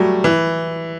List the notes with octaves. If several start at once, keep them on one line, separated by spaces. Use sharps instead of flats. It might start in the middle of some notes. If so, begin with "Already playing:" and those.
Already playing: F#3 G3 A3
E3